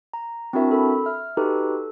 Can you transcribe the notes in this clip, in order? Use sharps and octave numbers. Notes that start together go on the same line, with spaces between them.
A#5
C4 D4 E4 F#4 A#4 E5
A4 B5
E5 F6
D#4 F#4 G4 A4 B4
A4